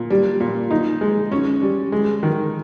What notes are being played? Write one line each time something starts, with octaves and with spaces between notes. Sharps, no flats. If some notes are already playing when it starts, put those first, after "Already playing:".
Already playing: A#2
G3
A#2
D#4
G#3
C#4
G3
G#3
D#3